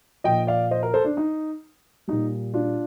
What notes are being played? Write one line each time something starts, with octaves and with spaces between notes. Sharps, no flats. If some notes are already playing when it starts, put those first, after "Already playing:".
A#2 F3 D#5 G5
D5 F5
C5 D#5
A#4
A4 C5
D4
D#4
A#2 G3 D#4
D4 F4